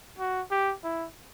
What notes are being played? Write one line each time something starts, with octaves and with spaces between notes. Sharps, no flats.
F#4
G4
E4